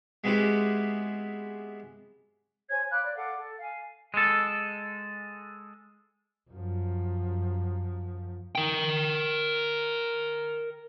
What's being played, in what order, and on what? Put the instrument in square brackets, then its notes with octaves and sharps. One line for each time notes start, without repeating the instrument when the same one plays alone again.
[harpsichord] G#3 B3 C4 E4 F#4 G4
[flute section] C5 C#5 G#5 G#6
F5 B5 D6 F#6
D5
A4 F5 F#5 D6
A4
F5 G#5
[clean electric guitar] G#3 A4
[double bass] F#2 F3
[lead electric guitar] A#4 G5